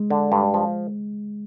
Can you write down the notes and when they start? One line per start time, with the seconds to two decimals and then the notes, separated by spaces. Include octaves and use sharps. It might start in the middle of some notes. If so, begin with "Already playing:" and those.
Already playing: G#3
0.10 D3
0.32 G2
0.54 F3